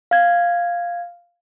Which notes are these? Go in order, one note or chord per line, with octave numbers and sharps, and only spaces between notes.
F5 G#6